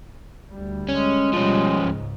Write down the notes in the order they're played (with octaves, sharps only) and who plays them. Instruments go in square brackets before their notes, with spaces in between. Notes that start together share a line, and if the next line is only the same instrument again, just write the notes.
[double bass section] D2 G3
[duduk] G#3 [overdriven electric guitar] C#4
[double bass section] B2 G3 [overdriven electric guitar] F3 C#4
[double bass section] C#2 G#2